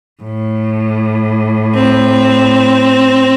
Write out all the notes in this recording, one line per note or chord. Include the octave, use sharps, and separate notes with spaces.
A2
C4